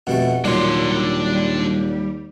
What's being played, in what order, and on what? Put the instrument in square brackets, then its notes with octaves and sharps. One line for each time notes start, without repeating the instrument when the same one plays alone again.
[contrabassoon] F1 [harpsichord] B2 G3 A3 [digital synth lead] F#5
[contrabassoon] D#2 [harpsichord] A#2 F#3 [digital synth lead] G3 [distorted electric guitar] D4 C6